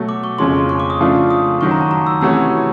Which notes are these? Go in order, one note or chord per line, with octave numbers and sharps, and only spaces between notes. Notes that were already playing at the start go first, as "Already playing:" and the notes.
Already playing: B2 F#3 A3
D6
C#6
F2 C#3 F3 G#3 C#4 C6
C#6
D6
D#6
C#3 F3 A3 D4 F4
D#6
F#2 D#3 F#3 C#6
A#5
A5
A#5
E6
C3 E3 A3 C#4 F#4 E6